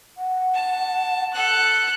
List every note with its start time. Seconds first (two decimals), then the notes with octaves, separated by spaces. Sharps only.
0.17 F#5
0.54 A5
1.33 A4 F#6